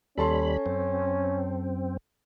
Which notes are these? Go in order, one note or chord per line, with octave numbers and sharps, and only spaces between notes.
D#2 G3 C#4 A4 A5 B5 C6
F#2 C4